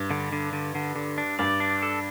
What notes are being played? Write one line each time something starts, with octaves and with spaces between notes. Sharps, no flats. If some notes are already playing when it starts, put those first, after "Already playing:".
Already playing: G2
D3
D3
D3
D3
D3
D4
G2 D5
D4
A4